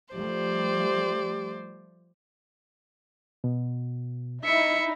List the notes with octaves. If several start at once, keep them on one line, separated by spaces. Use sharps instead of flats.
F3 G3 A3 G4 C5 D5
B2
D#4 E4 E5 C#7